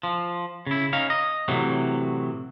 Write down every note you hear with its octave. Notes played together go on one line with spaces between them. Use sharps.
F3
C#3 E4
C#4 D#4 F5
D#5
A2 C3 E3 F#3